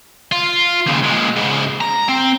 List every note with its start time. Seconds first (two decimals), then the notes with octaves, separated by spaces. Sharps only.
0.32 F4
0.86 D#2 C#3
1.03 A#2 G#3
1.36 G#2 C#3
1.81 A#5
2.09 C4